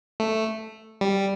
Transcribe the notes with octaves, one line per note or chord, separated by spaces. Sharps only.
A3
G3